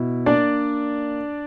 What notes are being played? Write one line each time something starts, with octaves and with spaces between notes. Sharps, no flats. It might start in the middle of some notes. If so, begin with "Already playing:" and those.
Already playing: B2 E4
A#3 D4 D5